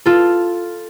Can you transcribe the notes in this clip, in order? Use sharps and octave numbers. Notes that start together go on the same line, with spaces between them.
F4 A4